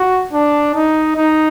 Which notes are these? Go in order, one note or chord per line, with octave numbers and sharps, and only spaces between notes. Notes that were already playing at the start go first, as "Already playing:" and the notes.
Already playing: F#4
D4
D#4
D#4